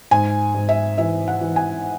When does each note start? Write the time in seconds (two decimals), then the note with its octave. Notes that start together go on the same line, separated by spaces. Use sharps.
0.11 G#2 G#5
0.54 G#2
0.69 E5
0.98 E3 E5
1.28 F#5
1.41 E3
1.56 G#5